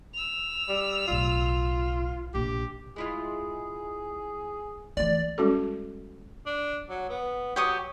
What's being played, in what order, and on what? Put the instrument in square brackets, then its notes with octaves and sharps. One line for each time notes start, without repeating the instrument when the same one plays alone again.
[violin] E6 F7
[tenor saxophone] G3
[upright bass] B1 A2 [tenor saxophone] F4
[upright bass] A#1 C3 [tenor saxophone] G4
[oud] G#3 E4 F4 [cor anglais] G#4
[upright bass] E3 A3 [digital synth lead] D5
[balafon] G3 G#3 C#4 F#4 A4
[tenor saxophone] D4
F#3
B3
[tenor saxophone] F#3 [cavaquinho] G4 C#5 D#6